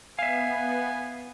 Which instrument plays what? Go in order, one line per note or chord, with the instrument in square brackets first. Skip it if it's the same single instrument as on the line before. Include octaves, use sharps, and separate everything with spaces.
[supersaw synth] B3 [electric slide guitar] E5 F5 [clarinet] G#5